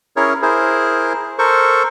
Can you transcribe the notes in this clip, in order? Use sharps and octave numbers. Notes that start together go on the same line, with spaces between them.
C#4 E4 G#4 A#4 C#5
E4 G#4 A#4 C5
A4 A#4 C5 C#6